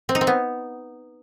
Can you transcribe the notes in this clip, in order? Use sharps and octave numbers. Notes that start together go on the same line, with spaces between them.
C4
D#4
C4
B3